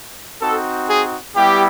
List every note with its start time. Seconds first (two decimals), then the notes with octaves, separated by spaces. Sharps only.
0.41 C4 D#4 F#4 A4
0.89 G#4
1.35 G3 B3 E4 G4